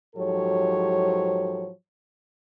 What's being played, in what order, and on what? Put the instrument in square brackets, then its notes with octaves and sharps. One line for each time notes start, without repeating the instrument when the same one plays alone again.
[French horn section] G#2 F3 F#3 G4 A4 C#5